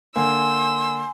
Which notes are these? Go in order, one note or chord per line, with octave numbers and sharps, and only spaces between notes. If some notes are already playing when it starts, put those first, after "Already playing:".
D3 A#3 G#5 C6 E6